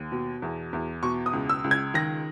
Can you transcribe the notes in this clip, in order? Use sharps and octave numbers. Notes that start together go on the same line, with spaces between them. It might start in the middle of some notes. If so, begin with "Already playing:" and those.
Already playing: D#2
B2
E2
E2
B2 C#6
D#6
C#2
E6
C#2
G#6
D#3 A#6